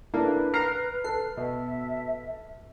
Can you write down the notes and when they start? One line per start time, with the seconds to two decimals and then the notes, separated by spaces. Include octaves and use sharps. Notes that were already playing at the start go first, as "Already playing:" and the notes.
0.14 A#3 D4 E4 A4 B4
0.54 A#4 A#5 F6 C7
1.04 A4 C7
1.37 B2 E5